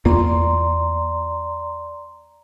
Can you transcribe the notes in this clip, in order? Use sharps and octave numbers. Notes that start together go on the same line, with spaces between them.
E2 A#3 F4 D5 A#5 C6